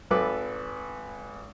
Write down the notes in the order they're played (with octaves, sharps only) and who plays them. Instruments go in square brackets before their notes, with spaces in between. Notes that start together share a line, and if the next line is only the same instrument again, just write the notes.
[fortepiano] G#1 A4 B4 D6